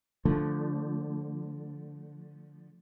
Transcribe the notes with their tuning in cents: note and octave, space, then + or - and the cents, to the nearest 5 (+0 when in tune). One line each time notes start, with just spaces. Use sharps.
D3 +0 F3 +0 A3 +0